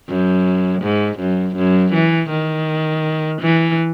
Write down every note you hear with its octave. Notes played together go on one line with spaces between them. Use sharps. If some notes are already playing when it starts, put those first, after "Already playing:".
F#2
G#2
F#2
F#2
E3
D#3
E3